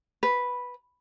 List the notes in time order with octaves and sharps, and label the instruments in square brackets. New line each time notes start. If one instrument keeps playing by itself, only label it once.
[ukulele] B4